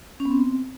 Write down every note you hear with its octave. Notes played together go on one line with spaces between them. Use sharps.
C#4
B3
C4